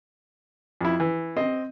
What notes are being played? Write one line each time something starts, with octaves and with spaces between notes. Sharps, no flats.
F2 E4
E3
C4 C5 D#5